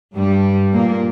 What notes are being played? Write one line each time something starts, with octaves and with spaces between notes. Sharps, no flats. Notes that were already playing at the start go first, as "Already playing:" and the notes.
G2 G3
A#2 A#3